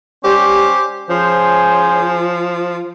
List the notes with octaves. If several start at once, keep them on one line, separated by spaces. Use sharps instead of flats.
G3 C#4 G4 C5
F3 C#4 G#4 C5